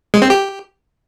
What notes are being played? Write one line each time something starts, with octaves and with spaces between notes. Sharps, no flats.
G#3
C4
G4